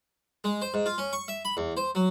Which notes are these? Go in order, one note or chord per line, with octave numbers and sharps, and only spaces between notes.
G#3
C5
G#2
F4
C#4
C#6
E5
B5
E2
C5
F#3